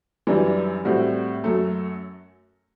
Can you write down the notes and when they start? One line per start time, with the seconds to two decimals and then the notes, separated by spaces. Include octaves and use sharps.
0.27 F#2 E3 G3 D4
0.85 A2 G3 C4 F#4
1.44 F#2 F#3 A3